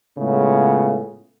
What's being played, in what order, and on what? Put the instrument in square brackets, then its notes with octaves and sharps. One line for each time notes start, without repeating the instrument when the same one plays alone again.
[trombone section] A2 C#3 G#3 A3 B3 F4